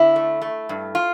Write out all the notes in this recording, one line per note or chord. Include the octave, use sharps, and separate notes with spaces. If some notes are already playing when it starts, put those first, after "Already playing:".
Already playing: D3 E4
A3
A3
G2
F4